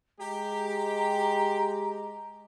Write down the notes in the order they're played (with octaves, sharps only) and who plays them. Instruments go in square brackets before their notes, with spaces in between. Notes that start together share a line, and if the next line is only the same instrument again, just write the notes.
[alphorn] G#3 [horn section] G4 [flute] A#5